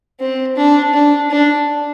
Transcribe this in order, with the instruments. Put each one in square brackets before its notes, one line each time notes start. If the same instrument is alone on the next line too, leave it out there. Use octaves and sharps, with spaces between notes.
[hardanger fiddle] C4
D4
D4
D4